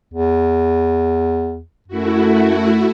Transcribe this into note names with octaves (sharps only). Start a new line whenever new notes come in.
E2
F#2 A3 E4 F#4